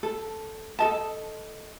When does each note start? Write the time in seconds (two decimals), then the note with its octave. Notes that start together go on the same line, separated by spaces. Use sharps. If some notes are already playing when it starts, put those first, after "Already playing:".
0.03 A4
0.79 A4 D#5 A5